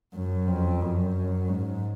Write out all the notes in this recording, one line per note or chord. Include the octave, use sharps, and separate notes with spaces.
F#2
F2
F#2
G#2